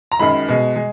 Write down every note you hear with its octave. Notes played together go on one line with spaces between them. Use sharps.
A#5
F#2 D#3 G#3 B5
B2 G#3
G#3